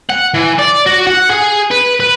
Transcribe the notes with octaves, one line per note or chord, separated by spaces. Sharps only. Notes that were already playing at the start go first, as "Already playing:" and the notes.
F#5
E3
D5
F#4
F#5
G#4
B4
B4